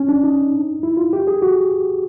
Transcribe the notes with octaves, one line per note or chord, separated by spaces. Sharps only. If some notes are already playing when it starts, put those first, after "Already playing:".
Already playing: C#4
D4
D#4
E4
F4
G4
G#4
F#4